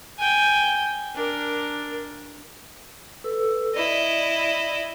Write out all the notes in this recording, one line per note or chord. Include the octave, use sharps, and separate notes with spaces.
G5 G#5
D4 A#4
A4 B4 E6
E4 D5 D#5